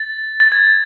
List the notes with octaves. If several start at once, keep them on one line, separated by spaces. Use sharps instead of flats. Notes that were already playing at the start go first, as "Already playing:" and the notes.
Already playing: A6
A6
G#6